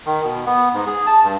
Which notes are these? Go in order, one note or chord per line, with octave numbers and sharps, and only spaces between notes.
D#3
B2
B3
G#2
G#4
A5
G2